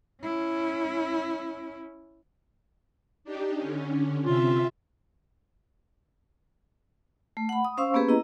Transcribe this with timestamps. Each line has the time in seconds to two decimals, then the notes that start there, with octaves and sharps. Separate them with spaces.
0.23 C#4 E4
3.24 D4 D#4 G4
3.57 D3 C#4
4.25 C3 F4 E5
7.37 A3
7.49 F#5 B5
7.65 D#6
7.78 C#4 C5 F5 C6 C#6 E6
7.94 A#3 B3 C#4 G4 G#4 B4
8.09 E4 D#5 A#5